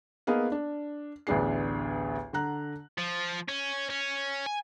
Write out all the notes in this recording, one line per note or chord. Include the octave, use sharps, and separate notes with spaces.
A#3 B3 D#4 G#4 F5
D4
A1 D2 B3 D4 G#4 C7
D3 F#5 A#5 F#6
F3
C#4
C#4
G#5